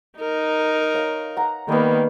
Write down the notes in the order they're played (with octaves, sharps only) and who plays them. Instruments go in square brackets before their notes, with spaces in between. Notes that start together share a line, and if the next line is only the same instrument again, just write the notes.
[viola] D#4 A#4
[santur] C#5 F5
F#5 A#5
[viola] D#3 A#3 [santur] G3 B3